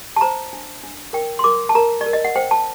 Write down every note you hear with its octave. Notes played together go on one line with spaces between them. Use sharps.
A5
C5 A#5
D4
D4
A#4 G5
C6
A#4 D6
A5
A#4 A#5
D5
A#4
D#5
F#5
C5 G5
A5